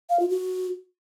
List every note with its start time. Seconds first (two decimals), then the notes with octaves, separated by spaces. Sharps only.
0.10 F5
0.19 F4
0.29 F#4